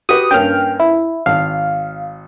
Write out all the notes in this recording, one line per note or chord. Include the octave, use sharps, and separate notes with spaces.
F#4 G4 B4 D#6
G2 A#3 C#4 G5 F6
E4
G#1 F5